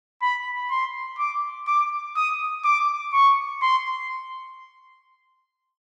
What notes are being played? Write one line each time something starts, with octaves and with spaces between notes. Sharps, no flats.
B5
C6
D6
D6
D#6
D6
C#6
C6